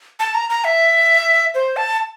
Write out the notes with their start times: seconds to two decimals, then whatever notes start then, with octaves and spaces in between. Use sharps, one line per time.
0.19 A5
0.34 A#5
0.50 A#5
0.64 E5
1.55 C5
1.77 A5